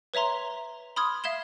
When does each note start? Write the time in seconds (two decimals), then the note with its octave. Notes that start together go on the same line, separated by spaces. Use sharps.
0.14 B4 C#5 E5 A#5 C6
0.96 B5 C6 D#6 F6 G#6
1.24 E5 F5 G#6 E7 G7